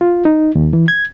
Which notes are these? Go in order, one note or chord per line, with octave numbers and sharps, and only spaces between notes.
F4
D#4
D#2
E3
G#6